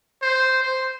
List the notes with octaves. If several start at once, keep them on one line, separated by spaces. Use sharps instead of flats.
C5
C5